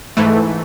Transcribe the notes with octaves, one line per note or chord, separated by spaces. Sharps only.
G#2 E3 A3